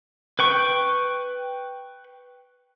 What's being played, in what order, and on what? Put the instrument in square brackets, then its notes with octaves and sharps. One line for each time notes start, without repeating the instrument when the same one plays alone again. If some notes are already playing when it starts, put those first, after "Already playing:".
[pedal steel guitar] B4 G5 C#6